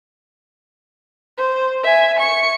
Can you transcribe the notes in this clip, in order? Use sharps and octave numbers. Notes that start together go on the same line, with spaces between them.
C5
E5 G#5
C#6 C#7